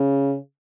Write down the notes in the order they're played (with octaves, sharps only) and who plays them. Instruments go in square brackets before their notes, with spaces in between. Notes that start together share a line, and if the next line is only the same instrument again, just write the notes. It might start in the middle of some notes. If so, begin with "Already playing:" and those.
Already playing: [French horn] C#3